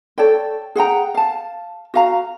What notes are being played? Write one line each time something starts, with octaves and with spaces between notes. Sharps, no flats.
A4 C#5 D5 G5
G#4 F#5 G5 A#5
F5 A5
F#4 F5 A#5